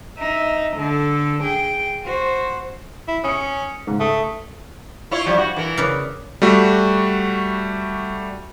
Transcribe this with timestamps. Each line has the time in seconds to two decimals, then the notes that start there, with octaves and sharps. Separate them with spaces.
0.18 D#4 E5
0.76 D3 A4
1.43 G#4 G5
2.04 F#4 C5
3.08 E4
3.24 C#4 D#6 C#7
3.87 G#2 C#3
4.00 A3 D#6
5.11 E4 F4 C#5
5.26 F3 G3 C#4
5.38 F#4
5.56 E3 A#4
5.77 C#3 B4 D5
6.42 G3 A3 F#4